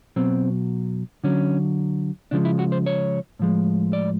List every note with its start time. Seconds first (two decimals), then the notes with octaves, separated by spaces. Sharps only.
0.16 B2 F#3 C4
1.24 D3 F#3 C#4
2.31 C#3 F3 G#3 D4
2.45 E4
2.59 F#4
2.72 C5
2.86 C#5
3.39 A2 F3 G#3
3.93 D5